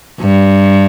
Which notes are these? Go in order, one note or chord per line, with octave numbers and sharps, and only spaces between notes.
G2